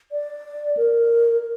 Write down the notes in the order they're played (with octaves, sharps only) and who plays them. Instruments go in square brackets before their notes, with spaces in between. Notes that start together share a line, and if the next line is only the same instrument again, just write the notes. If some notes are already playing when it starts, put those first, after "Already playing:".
[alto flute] D5
A#4